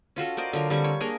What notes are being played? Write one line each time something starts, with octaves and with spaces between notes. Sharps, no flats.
C#4 F4 F#4 A4
A#4 C5 D5 D#5
D3 F#3 F4 A#4
D3 G3 C4 C#6
C#5
A#3 D4 G#4 A#4